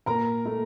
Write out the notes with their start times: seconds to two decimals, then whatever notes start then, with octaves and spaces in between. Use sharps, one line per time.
0.06 A#2 A#4 A#5
0.45 A3